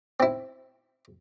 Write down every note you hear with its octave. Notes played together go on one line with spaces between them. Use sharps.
C4 E4